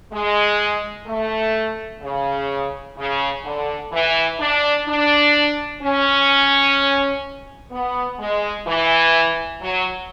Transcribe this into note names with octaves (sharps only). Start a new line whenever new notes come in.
G#3
A3
C#3
C#3
D3
E3
D4
D4
C#4
B3
G#3
E3
F#3